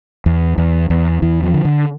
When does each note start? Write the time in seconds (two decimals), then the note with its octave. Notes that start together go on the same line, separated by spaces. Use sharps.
0.26 E2
0.58 E2
0.90 E2
1.22 E2 E3
1.43 F3
1.54 D3
1.65 D3